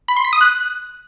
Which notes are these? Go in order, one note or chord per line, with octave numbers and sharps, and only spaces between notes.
B5
C6
B6
D#6
F#6